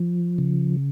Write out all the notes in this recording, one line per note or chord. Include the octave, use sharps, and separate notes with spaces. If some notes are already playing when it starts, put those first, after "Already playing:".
Already playing: F3
C#3